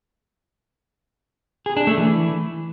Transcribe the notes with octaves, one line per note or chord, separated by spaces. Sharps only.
G#4
D4
A3
E3